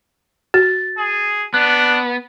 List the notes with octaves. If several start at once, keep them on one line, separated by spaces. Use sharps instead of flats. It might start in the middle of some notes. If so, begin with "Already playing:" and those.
F#4 A6
G#4
B3 D4 F#6